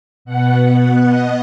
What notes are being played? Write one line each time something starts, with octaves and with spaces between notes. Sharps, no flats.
B2 B3 F#5
D#5